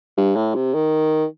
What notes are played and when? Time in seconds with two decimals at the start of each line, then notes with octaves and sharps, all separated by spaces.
0.17 G2
0.36 A2
0.55 C3
0.74 D#3